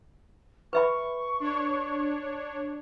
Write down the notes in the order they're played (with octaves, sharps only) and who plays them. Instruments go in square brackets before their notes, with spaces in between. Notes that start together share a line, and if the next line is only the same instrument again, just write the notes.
[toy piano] B4 E5 B5 [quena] C#6
[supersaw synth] D4 C#5